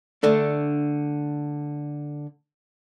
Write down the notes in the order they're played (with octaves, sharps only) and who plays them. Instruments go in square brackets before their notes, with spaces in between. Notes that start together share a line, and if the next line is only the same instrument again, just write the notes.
[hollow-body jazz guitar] D3 A3 D4